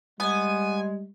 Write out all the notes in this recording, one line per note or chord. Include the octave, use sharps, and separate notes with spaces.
G3 G#3 B3 G#5